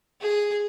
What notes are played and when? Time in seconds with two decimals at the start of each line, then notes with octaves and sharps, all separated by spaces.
0.21 G#4